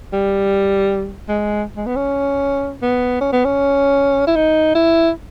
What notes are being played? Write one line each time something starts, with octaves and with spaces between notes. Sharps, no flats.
G3
G#3
G#3
B3
C#4
B3
C#4
B3
C#4
E4
D#4
E4